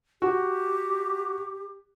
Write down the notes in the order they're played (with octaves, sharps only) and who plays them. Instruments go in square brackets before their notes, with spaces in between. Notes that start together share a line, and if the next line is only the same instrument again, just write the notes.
[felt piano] F#4 [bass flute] G4